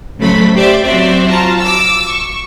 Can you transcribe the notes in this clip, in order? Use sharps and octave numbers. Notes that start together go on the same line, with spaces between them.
A1 C#3 F#3 A3 C5 B5
G4 C5 D5 E5 D6
F#3 C4 F#4 C5 D5 E5
F4 F#4 A5 A#5
D6 E6
C#6